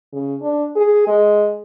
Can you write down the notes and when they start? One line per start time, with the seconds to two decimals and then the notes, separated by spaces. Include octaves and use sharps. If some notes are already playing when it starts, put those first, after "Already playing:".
0.12 C#3
0.42 D4
0.76 G#4
1.07 G#3